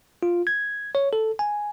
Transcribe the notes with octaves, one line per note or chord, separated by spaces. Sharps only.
F4
G#6
C#5
A4
G#5